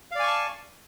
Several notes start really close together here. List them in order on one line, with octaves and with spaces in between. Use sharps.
F5 D5 G#5 C#6 A5